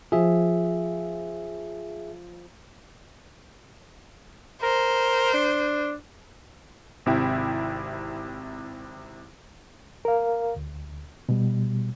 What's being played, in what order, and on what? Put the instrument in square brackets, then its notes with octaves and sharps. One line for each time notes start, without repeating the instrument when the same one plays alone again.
[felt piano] F3 [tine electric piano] G#4 E5
[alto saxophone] A#4 [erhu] C5
[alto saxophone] D4
[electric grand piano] G#1 C3 E4 G5
[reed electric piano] A#4 F5
D2
B2 G3